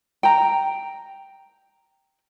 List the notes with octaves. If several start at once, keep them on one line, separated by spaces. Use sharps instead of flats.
G5 A#5